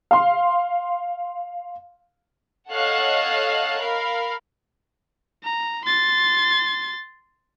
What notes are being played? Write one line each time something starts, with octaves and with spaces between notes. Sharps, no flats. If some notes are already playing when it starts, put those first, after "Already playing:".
F5 C6
A4 C#5 D#5 F5 F#5 F#6
A#4 F5 B5
A#5
C6 A6